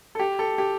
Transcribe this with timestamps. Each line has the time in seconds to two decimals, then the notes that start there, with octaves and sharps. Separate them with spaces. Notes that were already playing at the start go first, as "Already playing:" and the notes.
0.15 A4
0.19 G4
0.39 A4
0.58 G4